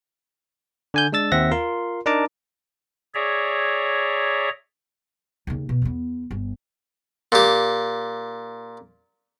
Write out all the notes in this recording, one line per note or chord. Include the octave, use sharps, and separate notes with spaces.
D3 G#5 G6
G#3 D4 E6 A6
D#2 C4 E5 F#5 A#6
F4 A#4 C6
D4 D#4 A#4 A5 A#5 D6
G#4 C#5 D5 E5 A#5
D#2 C#3
B2
E2 B3
G1
A#2 G4